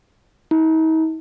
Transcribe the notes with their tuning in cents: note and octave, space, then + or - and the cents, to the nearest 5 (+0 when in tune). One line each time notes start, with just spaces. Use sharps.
D#4 +45